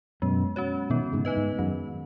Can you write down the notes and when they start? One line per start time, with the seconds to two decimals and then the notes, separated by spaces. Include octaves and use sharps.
0.22 F#2 B2 G#3
0.56 C#4 F#4 C#5
0.90 B2 D#3 B3
1.13 G#2 C#3
1.25 D#4 B4 D#5
1.37 G#2
1.59 F#2 D#3